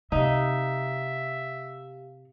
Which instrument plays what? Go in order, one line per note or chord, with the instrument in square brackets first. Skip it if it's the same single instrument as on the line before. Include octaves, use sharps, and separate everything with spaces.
[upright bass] C3 [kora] D#4 [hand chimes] G4 F5 [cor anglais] E5